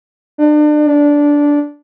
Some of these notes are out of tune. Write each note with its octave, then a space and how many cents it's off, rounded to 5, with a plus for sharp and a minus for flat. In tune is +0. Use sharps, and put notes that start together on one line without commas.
D4 +35
D4 -10